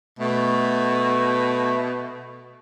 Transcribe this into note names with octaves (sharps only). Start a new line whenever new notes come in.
B2 A3